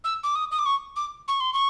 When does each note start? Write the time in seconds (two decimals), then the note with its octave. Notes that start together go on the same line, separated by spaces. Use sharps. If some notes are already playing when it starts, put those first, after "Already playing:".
0.04 E6
0.24 D6
0.35 D#6
0.51 D#6
0.59 D6
0.66 C#6
0.96 D6
1.28 C#6
1.40 C6
1.53 C#6